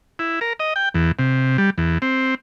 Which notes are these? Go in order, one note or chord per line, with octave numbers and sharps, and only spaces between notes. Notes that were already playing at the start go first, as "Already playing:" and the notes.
E4
A#4
D#5
G5
E2
C3
G3
E2
C4